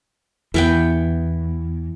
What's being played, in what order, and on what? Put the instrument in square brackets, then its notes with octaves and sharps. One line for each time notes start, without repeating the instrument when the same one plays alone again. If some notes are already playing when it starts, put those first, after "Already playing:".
[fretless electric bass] E2 [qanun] E3 B3 G5